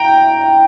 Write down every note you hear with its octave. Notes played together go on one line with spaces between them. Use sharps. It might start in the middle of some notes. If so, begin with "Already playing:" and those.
Already playing: G5 A#5